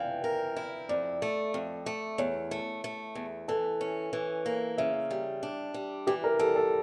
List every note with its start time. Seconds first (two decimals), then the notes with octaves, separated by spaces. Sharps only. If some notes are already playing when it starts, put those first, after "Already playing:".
Already playing: E3 F5 G5
0.24 A#4
0.56 E4
0.89 F2 D5
1.22 A3
1.54 F2
1.86 A3
2.18 E2 C#5
2.51 A3
2.84 A3
3.15 E2
3.48 E3 A4
3.81 C#4
4.13 E3
4.46 A#3
4.78 C#3 E5
5.11 G3
5.43 D4
5.74 G3
6.07 E3 G4
6.24 A#4
6.39 G3 A4
6.56 A4